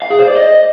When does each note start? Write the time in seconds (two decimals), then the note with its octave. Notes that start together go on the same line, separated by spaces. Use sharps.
0.02 F5
0.10 G#4
0.19 C5
0.27 D5
0.36 D#5